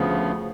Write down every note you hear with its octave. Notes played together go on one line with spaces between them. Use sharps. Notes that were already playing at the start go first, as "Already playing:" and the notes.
Already playing: D2 C#3 F3 B3